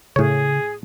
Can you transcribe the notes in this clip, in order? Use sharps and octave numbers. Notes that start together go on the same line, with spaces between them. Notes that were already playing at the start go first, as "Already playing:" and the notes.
A2 C#3 G#4 C#5